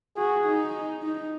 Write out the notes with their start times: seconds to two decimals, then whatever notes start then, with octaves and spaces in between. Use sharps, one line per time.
0.17 F#4 G#4
0.45 D#4
1.02 D#4